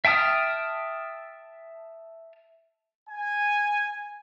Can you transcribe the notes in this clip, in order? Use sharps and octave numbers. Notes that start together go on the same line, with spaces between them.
E5 G5 A5 D#6 F6
G#5